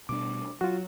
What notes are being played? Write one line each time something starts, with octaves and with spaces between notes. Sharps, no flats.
B2 G3 D4 D6
F#3 F4 F#4